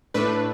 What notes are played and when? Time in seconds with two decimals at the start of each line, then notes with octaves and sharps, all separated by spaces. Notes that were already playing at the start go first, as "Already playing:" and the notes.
0.14 A2 A3 D4 B4